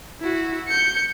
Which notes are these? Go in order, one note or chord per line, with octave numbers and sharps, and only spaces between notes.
E4 F#4
G6 C#7